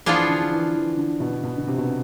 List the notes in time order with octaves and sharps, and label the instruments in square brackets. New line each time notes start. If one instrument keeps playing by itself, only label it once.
[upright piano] E3 [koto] F3 B3 D4 F4 G#4
[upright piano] D3
D3
E3
E3
D3
B2
B2
D3
C3
B2